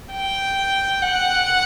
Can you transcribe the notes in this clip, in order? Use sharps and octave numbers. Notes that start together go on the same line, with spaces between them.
G5
F#5